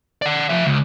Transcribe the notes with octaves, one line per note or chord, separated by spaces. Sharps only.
D5 F#5
F3 E5
C#2